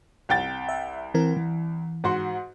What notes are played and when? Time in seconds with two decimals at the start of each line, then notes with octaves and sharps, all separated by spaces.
0.29 C2 G5 A6
0.69 E5
1.14 E3 C4 A#4
1.36 E3
2.04 G#2 F#4 C6